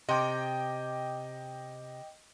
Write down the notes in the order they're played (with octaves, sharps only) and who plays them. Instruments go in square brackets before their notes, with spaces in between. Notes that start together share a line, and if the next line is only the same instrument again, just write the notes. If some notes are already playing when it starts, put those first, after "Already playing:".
[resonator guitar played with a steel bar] C3 [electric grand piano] D#5 G5 D6